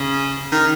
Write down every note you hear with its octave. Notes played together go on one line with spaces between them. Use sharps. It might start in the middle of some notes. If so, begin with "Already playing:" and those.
Already playing: C#3
D#3